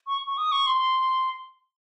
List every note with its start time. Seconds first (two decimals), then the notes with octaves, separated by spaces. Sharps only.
0.07 C#6
0.27 C#6
0.38 D#6
0.52 C#6
0.67 C6